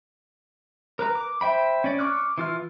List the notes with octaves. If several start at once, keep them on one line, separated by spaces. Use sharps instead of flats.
A#4 B4 A#5
D6
C5 E5 G5 B5
C#4 D5
C#6 D6 F6 F#6
E3 F4 F6